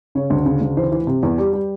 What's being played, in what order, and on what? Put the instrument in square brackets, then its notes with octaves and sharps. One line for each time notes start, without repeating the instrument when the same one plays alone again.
[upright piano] C#3 C#5
D2
C#3
D2
E3 C5
E3
C3
E2
G3 G4
G3